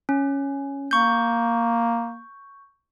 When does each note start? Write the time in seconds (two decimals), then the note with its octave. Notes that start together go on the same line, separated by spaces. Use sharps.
0.09 C#4
0.91 A#3 C#6 G6